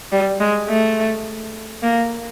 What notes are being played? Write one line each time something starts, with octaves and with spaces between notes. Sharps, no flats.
G3
G#3
A3
A#3